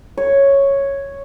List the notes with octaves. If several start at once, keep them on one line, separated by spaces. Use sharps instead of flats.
C#5